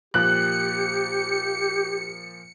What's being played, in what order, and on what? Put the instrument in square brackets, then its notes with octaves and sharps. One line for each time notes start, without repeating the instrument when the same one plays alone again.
[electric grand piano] A#2 F3 A#3 [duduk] G4 [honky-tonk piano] F#6 [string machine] C#7